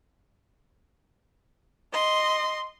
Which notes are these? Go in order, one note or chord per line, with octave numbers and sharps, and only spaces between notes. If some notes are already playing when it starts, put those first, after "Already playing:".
D#5 C6